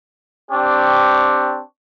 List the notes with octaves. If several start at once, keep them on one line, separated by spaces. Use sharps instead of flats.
C4 D4 G4 C#6